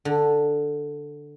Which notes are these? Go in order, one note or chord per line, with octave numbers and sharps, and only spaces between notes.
D3